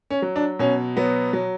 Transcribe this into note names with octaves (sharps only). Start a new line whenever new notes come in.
C#4
F#3
D4
B2 C#4
F#3 B3
F#3